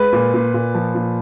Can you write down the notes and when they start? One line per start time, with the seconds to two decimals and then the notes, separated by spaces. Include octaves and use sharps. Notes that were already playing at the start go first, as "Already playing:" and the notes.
Already playing: G#3 B4
0.13 A#2
0.34 A#2
0.54 A#2
0.75 F3
0.95 A#2